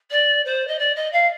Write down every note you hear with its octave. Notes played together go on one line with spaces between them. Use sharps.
D5
C5
D#5
D5
D#5
F5